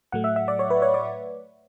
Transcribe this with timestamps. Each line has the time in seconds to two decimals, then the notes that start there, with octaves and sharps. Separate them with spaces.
0.12 A2 F#3 A3 F#5
0.24 E5
0.36 E5
0.48 D5
0.59 C#5
0.70 B4
0.82 C#5
0.94 D5